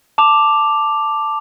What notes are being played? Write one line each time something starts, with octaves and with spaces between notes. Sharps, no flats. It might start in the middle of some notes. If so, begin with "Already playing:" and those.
A5 D6 F7